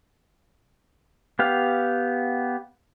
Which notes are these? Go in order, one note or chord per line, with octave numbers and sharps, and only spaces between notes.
B3 G4 F5